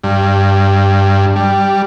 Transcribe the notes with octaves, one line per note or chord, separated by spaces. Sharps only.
G2
G3